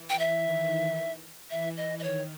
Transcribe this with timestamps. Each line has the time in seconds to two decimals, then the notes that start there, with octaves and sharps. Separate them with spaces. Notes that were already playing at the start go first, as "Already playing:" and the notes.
Already playing: E3
0.10 G5
0.19 E5
0.45 D#3
1.50 E3 E5
1.77 D#5
1.99 D#5
2.03 D#3 C#5